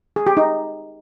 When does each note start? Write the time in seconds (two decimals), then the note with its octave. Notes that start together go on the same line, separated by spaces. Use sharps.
0.16 G#4
0.27 G4
0.37 D#4